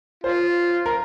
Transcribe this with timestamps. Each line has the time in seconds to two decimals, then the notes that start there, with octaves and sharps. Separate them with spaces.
0.24 F4 C5
0.86 A#4